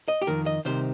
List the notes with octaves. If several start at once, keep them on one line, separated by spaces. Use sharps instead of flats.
D#5
G4
F2 D#3 A#4
D#5
C2 C3 D#3 C5